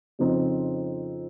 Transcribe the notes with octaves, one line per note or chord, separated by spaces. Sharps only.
F2 C#3 F3 C4 D#4